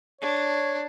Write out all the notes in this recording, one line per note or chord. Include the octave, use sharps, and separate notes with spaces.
D4 C#5